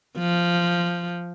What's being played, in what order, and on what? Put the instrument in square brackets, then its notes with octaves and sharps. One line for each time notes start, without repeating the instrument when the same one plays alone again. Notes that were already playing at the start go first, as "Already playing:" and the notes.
[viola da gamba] F3